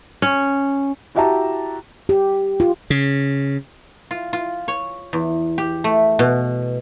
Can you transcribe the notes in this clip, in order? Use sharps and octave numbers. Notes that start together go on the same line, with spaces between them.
C#4
E4 F#4 G4 E5 A5 A#5
G4
F4
C#3
F4
F4
C#5
E2
G4
A3
B2